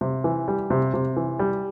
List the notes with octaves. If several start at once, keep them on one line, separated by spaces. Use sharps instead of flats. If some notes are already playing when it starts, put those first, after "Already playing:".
C3
E3
G3
C3
C3
E3
G3